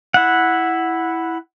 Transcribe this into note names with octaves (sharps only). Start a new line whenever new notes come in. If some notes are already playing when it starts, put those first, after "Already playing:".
E4 F#5